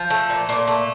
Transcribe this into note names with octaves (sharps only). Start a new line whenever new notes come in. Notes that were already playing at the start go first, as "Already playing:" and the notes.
Already playing: F3
A3
A#2
A#2
A3